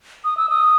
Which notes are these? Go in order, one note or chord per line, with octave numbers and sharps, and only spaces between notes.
D#6
E6
D#6